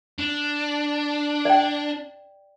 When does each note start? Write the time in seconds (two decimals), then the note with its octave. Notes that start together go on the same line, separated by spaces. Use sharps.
0.18 D4
1.45 D5 G5